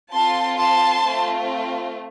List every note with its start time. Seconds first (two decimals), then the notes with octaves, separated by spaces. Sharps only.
0.13 C4 F4 A4 A5 C6
0.58 A5 C6
1.05 A3 C4 F4